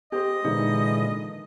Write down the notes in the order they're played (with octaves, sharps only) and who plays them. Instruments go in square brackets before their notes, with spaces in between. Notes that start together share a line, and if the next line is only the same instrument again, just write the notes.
[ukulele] G4 C5 [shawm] D#5
[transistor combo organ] A#2 D3 E3 [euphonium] G#3 [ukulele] D#4